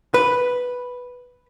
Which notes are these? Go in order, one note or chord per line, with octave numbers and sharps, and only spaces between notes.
B4